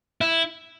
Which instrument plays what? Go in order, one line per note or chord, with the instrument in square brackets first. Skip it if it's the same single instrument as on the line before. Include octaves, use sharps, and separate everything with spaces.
[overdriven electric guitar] E4